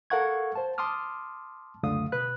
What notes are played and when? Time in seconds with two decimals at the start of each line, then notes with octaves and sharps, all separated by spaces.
0.10 A4 A#4 F5 F#5 C#6 G#6
0.55 C5 A5
0.78 A5 C6 D6 D#6 F6
1.83 C#2 F#2 D3 A3 F5 D#6
2.12 B2 B4 F#6